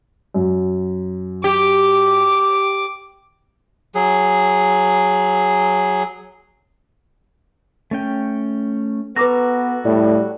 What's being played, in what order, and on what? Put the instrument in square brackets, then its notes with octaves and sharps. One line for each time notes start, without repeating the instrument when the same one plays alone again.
[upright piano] F#2
[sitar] G4 [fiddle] D6
[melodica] F#3 G#4
[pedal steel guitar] A3 C#4 G5
[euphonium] B3 [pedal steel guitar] F#4 A4 A#5 [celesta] B4 D6 A#6
[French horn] A2 [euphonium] G3 [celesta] D5